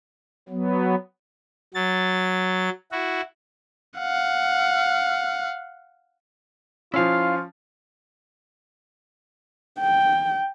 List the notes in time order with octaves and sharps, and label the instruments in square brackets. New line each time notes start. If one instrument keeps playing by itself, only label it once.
[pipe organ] F#3 B3
F#3 A6
E4 F#4
[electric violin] F5 F#5
[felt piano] F3 C#4 [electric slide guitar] E4 F5 [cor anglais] F4
[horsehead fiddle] G5